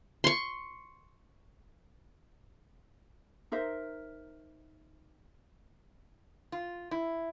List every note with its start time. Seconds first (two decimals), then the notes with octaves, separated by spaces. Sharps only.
0.24 C6 C#6
3.52 D#4 A#4 C5 E5
6.52 F4
6.91 E4